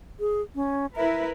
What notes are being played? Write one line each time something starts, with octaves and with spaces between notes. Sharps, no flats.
G#4
C#4
E4 A#4 B4 E5